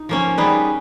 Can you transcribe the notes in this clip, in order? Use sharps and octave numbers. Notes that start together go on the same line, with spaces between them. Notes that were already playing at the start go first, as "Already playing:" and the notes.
Already playing: D#4
F3 A#3 C#4
G3 B3 D#4 G#4 B4